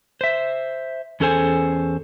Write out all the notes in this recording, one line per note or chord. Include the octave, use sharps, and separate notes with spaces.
C5 E5
E2 C#4 G#4 A4 C5 G#5